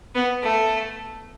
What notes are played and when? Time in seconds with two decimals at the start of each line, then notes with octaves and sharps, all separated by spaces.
0.15 B3
0.43 A3